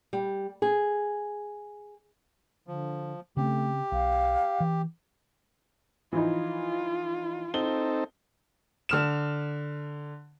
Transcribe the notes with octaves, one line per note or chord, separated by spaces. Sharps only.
G3
G#4
D3 F3
C#3 A3 C4 C#4 G4
B1 F5
E3
E3 F3 D#4 F4
C4 D#4 A4 G7
D3 F6 E7